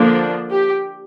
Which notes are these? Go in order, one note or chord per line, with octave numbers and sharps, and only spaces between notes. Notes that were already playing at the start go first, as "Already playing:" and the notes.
Already playing: D3 F3 A#3 D4
G4